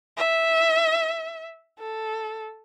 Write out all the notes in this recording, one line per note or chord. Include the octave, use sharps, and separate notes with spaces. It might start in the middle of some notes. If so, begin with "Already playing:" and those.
E5
A4